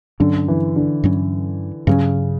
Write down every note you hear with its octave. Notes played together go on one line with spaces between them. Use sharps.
G2 D3 F#3 C#4
E3
D3
G2 F#3 C#4
G2 C#3 F#3 C#4